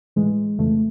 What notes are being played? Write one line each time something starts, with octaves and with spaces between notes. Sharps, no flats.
A2 E3 G#3
F2 C#3 E3 A3